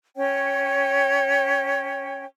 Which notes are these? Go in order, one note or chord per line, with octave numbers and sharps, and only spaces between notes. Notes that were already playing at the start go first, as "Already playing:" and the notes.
C#4 C#5 G5